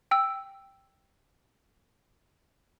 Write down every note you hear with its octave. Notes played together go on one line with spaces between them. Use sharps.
G5 E6